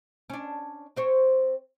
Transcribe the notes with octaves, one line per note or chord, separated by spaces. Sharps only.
C#4 D4
C4 C5 C#5